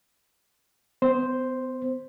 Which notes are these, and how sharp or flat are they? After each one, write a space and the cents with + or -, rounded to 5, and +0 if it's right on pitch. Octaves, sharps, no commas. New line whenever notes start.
B3 +40 C5 +0